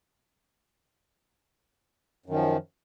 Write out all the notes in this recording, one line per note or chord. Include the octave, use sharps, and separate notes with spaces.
F#2 D#3 F3